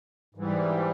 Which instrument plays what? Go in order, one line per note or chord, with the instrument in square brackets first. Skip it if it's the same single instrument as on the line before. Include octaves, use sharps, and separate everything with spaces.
[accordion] G#2 E3 G3